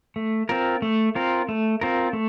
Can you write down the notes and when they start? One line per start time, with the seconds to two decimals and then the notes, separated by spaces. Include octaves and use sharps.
0.16 A3
0.49 C4 F4 A#4
0.82 A3
1.15 C4 F4 A#4
1.49 A3
1.81 C4 F4 A#4
2.13 A3